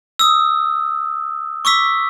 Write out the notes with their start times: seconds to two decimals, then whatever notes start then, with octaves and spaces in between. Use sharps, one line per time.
0.19 D#6 E6
1.65 C#6 D6 E6 B6